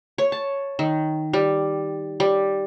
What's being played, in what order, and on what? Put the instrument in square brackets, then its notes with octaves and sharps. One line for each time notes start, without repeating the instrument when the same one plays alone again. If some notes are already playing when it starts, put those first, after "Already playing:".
[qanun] C#5
A5
D#3
G3
G3